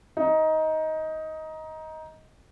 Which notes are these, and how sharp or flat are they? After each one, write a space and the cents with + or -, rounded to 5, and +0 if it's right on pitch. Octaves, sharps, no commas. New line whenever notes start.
D#4 +15